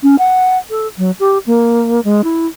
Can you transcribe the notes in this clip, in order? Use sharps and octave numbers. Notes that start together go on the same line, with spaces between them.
C#4
F#5
A4
F#3
G4
A#3
G#3
E4